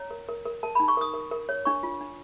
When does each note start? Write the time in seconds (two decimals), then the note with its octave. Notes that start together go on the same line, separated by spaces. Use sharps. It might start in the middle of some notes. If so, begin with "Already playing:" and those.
Already playing: C#5 A#5
0.11 A#4
0.29 A#4
0.45 A#4
0.63 A#4 A5
0.75 D#4 B5
0.88 C#6
0.97 A#4 D#6
1.14 A#4
1.31 A#4
1.49 C#5
1.65 D4 C#6
1.83 F4
2.01 D4